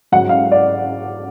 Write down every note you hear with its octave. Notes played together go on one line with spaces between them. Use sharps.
G#2 F#3 F#5
F5
D5